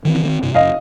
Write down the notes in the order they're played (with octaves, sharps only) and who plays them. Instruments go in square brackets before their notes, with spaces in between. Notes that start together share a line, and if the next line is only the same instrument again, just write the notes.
[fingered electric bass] D#3 E3 C4
D#3 B3 C4
G2 C3
[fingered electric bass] F#1 [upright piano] D#5 F5